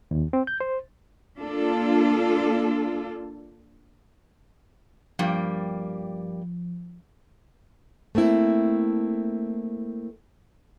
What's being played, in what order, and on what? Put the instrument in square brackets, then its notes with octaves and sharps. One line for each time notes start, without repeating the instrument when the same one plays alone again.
[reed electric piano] D#2
C4
G6
C5
[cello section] A#3 D4 F4 A4
[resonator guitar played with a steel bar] G2 G3 A#3 [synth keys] F3
[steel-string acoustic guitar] A3 A#3 C4 E4